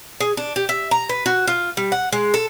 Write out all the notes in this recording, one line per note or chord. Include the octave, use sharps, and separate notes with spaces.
G#4
D4
G4
E5
A#5
B4
F#4
F4
G3
F#5
G#3
A4